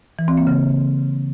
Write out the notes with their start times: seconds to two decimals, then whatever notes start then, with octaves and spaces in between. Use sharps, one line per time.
0.19 E3
0.28 C4
0.37 A#3
0.47 C#3